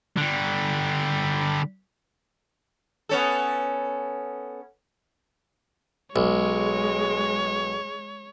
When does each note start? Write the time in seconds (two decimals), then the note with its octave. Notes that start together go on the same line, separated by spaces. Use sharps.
0.18 D3 G3
3.09 B3 C#4 A4
6.16 B1 G#3 C#5